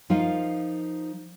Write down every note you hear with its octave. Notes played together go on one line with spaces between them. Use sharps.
F3 D#4 F4 A#4 F5